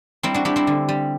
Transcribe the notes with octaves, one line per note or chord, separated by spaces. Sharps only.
G3 C4 E4
D4 F#4
G3 E4 G4
C4 E4
D3
G3